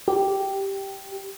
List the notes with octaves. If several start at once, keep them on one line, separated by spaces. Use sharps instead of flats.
G4